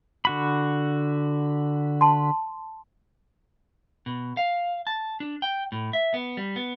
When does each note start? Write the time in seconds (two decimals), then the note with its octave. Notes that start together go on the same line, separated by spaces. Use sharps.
0.25 D3 F#4 B5
2.01 A5 C6
4.06 B2
4.37 F5
4.87 A5
5.20 D4
5.42 G5
5.72 A2
5.93 E5
6.14 B3
6.37 G3
6.56 B3